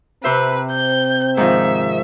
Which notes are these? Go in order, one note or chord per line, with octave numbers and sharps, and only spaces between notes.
C3 C4 B4 C5 E5
G6
G#2 D#3 F3 E5